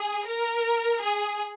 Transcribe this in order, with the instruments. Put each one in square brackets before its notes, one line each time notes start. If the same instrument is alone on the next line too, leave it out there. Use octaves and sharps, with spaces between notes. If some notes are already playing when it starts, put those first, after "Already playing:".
Already playing: [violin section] G#4
A#4
G#4